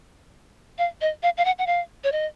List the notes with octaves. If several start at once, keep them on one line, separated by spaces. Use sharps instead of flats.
F5
D#5
F5
F5
F#5
F#5
F5
C#5
D#5